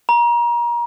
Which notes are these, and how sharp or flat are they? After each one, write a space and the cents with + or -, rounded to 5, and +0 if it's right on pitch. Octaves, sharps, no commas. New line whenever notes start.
A#5 +30